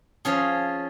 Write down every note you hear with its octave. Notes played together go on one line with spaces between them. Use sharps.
F3 C#4 G#4